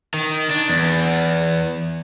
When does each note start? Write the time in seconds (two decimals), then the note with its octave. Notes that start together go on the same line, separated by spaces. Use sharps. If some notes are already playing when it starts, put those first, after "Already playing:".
0.14 D#3
0.50 D4
0.69 E2